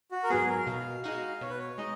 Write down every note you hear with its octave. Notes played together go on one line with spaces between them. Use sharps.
F#4
A#4
G#2 F#3 B3 G#4
A#4
B2 F5
G#3 D#4 F#4 F5
B2 C#5
B4
C#5
G#3 D#4 D#5